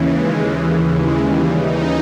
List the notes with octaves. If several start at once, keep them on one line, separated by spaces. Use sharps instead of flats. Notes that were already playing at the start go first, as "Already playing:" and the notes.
Already playing: D#2 C#3 E3
G#3
G#3
G3
D#4